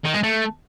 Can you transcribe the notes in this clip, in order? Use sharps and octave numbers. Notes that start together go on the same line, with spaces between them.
D#3
G#3
A3